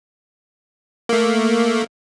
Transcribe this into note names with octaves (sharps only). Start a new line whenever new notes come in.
A3 A#3